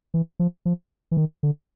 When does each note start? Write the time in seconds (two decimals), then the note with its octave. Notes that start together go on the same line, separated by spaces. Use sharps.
0.14 E3
0.39 F3
0.65 F3
1.11 E3
1.17 D#3
1.43 D3